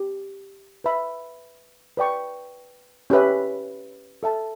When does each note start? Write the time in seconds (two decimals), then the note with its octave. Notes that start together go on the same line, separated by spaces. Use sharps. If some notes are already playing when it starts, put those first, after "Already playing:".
Already playing: G4
0.84 B4 E5 B5
1.97 B4 D5 G5 C#6
3.10 C#4 G4 B4 E5
4.23 A4 E5 A5